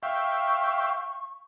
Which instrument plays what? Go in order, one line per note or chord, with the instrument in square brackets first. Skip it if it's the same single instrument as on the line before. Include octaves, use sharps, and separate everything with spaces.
[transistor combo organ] E5 F5 G5 [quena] C#6